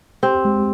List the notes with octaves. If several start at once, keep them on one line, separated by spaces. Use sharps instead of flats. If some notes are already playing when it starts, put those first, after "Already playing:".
C4 G4
G#3